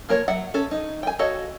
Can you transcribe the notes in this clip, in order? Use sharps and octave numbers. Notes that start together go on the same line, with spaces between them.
F3 A#3 A#4 C#5
F#3 E5 F#5
C#4 A4
D#4
G5 G#5
F#4 A4 C#5 D#5 F5